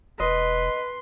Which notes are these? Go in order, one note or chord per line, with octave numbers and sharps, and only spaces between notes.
E1 B4 D#5 C6